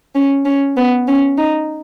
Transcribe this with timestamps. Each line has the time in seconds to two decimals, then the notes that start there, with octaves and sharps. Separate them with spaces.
0.15 C#4
0.45 C#4
0.77 B3
1.08 C#4
1.38 D#4